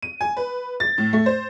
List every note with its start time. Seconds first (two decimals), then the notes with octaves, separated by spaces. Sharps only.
0.02 D#7
0.21 G#5
0.37 B4
0.80 A6
0.98 A2
1.13 A3
1.26 C5